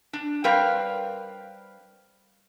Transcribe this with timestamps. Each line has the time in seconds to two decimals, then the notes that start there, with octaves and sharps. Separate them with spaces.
0.13 D4
0.44 G3 C4 A#4 B4 F5 G5